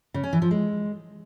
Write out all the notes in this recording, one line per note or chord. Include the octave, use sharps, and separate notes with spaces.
C#3
C#4
E3
F3
G#3